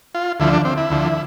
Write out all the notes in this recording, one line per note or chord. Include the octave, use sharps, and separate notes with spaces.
F4
D2 D3 F3 E4
D4
C4
E4
D2 D3 F3